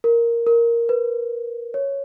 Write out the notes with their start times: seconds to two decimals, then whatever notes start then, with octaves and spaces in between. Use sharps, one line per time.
0.04 A#4
0.47 A#4
0.89 B4
1.74 C#5